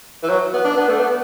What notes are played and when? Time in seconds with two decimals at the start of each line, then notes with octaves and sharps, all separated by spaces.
0.23 E3
0.29 F#3
0.53 B3
0.65 D4
0.77 B3
0.88 A3
0.99 B3